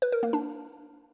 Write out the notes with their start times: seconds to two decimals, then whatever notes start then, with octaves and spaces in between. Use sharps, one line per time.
0.02 B4
0.12 A#4
0.23 A#3
0.33 D4